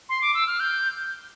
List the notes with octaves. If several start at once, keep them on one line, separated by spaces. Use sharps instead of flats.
C6
D6
E6
F6
G6